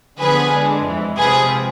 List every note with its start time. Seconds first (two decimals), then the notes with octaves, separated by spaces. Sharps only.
0.19 D3 F3 B3 G#4 B4
0.53 D3 G#3 D4
0.85 F2 E3 G#3
1.17 C3 F3 G#3 C4 G#4 B4